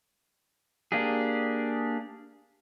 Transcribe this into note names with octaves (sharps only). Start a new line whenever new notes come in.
A#3 D4 G4 G#4